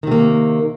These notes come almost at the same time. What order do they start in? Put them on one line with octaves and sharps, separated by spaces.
D#3 C3 A#3